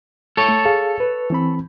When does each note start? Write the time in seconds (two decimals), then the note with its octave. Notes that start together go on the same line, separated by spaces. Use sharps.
0.37 A4 C#5
0.49 A3
0.65 G#4 F5 A5
1.00 B4
1.30 E3 C4 B5